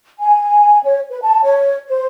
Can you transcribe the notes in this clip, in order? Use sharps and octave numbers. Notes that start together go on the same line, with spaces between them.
G#5
C#5
B4
A5
C#5
C5